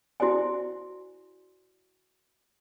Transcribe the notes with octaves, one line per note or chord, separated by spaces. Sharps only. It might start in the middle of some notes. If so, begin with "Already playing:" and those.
E4 F#4 C5 D5 G#5